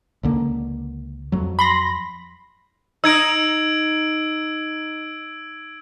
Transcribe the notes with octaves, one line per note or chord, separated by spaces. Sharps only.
C#2 D3 A#3
F2 F#3
B5 C6 A#6
D#4 E6 G#6 D7